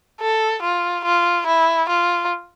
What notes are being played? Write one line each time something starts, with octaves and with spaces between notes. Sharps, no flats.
A4
F4
F4
E4
F4